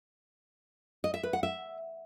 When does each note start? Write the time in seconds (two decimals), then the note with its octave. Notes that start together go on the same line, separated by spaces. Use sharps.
1.04 D#5
1.14 E5
1.23 B4
1.33 F#5
1.43 E5